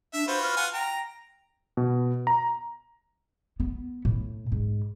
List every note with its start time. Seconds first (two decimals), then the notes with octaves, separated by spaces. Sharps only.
0.13 D4 E5
0.27 F4 F#4 B4 C5
0.42 F6
0.56 F4 F#5 G#5
0.73 G5 A#5
1.77 B2
2.27 A#5
3.60 B3
4.05 A2
4.52 G#2